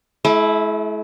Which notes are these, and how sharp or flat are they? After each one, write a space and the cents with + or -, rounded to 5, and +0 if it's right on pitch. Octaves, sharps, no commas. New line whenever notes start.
A3 -45 E4 +0